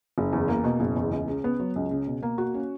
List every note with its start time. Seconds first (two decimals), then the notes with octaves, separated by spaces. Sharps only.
0.18 F#1
0.33 E2
0.48 A#3
0.64 B2
0.80 F#1
0.96 E2
1.11 C#2
1.28 C#3
1.44 B3
1.59 F#3
1.76 C#2
1.91 C#3
2.07 B2
2.23 A#3
2.38 F#4
2.54 C#4